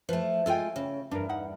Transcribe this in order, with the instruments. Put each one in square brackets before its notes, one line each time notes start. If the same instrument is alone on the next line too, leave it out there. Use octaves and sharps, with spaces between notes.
[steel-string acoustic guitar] F3 A3 [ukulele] B4
[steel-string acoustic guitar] G#3 F4 G#5 [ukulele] A4 G5
[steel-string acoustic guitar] C#3
[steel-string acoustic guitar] E2 G2 [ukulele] D4 A#4
[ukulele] D#4 F#5